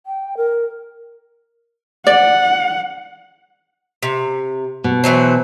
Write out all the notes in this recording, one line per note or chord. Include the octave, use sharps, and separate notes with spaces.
G5
A#4
D5 F#5
C3
B2
E3 F#3 C5